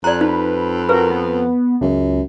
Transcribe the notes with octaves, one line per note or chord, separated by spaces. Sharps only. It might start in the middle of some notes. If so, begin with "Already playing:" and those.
F2 D5 A#5 F#6
D#4 B4
F#4 A#4 B4
B3
C#2 F#2